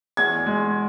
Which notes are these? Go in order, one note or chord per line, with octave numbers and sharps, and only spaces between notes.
E2 G#6
G#3